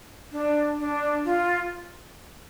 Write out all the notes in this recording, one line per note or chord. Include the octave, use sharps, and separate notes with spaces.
D4
D4
F4